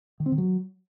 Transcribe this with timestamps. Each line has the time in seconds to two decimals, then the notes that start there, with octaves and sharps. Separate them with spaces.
0.20 D#3
0.26 C4
0.32 D#3
0.38 F#3